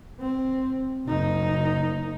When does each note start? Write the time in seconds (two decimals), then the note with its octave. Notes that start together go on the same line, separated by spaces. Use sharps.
0.20 C4
1.08 F#1 D#4